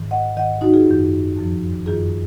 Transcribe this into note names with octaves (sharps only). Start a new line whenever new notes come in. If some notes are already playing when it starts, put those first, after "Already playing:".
Already playing: G#2 D#3
D#5 F#5
G#2 D#3 D#5 F#5
D#4 F#4
F4 G#4
F#2 D#3
F2 F3
F#2 D#3 F4 G#4